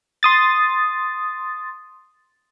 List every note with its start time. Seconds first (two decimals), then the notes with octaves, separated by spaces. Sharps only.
0.23 C6 D#6 A6